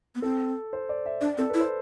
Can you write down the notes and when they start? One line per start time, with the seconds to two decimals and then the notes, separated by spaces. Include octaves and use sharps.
0.15 B3
0.22 C4 A4
0.73 C5
0.89 D5
1.06 E5
1.21 D4 D5
1.38 C4 A4
1.50 E4 B4
1.60 C5